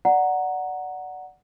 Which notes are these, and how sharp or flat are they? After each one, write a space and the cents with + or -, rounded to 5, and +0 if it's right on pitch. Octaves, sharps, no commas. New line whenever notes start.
D5 +0 F#5 +0 A#5 +0